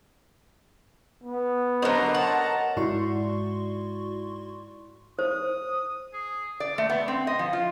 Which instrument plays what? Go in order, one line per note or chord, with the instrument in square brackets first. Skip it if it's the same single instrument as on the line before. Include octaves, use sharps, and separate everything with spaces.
[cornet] B3
[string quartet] D3 A#5 [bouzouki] F#3 C5 [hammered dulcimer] A#4 C#5 D#5
[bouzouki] F#5 [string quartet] A5 A#5
[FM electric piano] G#2 E4 F#4 D5 C6 C#6
[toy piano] C5 [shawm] D#6
[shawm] G#4
[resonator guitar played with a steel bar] D5
A3
B3
C4
D#5
F3
F4